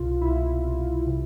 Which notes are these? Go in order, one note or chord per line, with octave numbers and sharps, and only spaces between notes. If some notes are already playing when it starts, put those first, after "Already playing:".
Already playing: C2 B2 F4
C2 E4
C2
C3